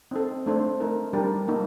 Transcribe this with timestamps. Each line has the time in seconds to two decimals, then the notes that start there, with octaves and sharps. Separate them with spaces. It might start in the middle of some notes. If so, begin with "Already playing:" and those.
0.11 C4 D#4 A4
0.46 A3 D4 A4 C5
0.80 A3 D#4 A#4
1.13 G3 D4 G4 A#4
1.48 G3 A#3 D#4